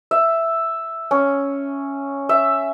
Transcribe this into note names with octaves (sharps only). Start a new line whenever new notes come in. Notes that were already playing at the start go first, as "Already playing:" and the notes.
E5
C#4
E5